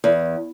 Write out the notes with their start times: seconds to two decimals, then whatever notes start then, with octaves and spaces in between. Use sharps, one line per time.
0.04 E2